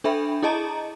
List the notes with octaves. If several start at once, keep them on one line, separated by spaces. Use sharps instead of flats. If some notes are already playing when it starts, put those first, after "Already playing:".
D4 A4 E5 G5 B5
E4 G#4 D#5 A5 A#5